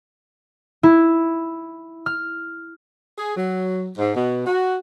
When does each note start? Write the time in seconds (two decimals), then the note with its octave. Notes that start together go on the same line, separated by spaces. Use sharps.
0.83 E4
2.06 F6
3.18 G#4
3.36 F#3
3.97 G#2
4.15 B2
4.47 F#4